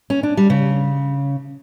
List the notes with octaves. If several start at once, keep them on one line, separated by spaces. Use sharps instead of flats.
C#4
D4
G3
C#3